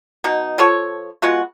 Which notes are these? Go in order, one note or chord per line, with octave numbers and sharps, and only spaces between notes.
B2 D#4
F3 F4 A4 C#5
G#3 B3 F4 F#4